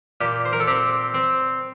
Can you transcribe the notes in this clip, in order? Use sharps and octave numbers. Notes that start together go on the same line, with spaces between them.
A#2 G4
C5
A#4
A4
C4 G4
C4